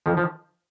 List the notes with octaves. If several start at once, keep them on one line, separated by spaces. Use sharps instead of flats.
F2 F3
F3